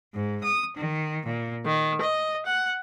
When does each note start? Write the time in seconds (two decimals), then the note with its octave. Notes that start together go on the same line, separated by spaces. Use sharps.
0.13 G#2
0.43 D#6
0.76 D#3
1.26 A#2
1.66 D#3
2.01 D#5
2.46 F#5